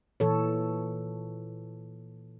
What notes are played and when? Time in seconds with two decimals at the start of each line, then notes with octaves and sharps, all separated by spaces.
0.20 A#2 E3 A4 C#5